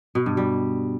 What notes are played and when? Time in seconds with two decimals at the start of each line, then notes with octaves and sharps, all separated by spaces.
0.15 B2
0.26 G2
0.37 G3